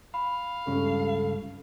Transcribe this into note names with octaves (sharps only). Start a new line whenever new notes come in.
F5 B5
C#2 G2 C#4 A4